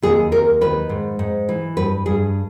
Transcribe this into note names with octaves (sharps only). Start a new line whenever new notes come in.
D#2 G#4
D#2 A#4
D#3 B4
G#2
G#2
E3
G2 B4
G2 G#4